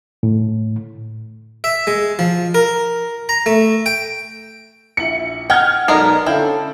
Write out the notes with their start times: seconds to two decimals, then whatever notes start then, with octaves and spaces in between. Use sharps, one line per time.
0.23 A2
1.64 E5
1.87 G#3
2.19 F3
2.55 A#4
3.29 A#5
3.46 A3
3.86 G5
4.97 A#1 E4 C#7 F#7
5.50 D#5 F#5 G5 F6 G#6
5.88 B1 G#3 B3 D#4 A4 A#4 D5 A5
6.26 D3 C#4 E4 A4 F5 G5 G6